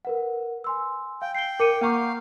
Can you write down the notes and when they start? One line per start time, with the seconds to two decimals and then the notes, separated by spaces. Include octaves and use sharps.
0.05 A#4 B4 F#5
0.64 G#5 C6 E6
1.22 F5 G5
1.35 G5 C7 G7
1.60 A#4 D6 C#7 D#7
1.81 A#3 F5 F#5 A#5 C#6 D6